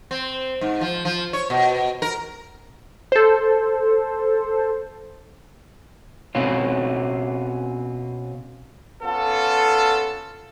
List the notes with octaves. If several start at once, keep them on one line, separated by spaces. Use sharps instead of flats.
C4
G#2
F3
F3
C#5
B2
A#4
A4 C5
B2 C4 C#4 F4
B3 C#4 F4 A4